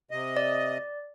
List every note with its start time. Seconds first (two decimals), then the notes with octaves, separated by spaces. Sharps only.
0.11 C3 D#5
0.37 D5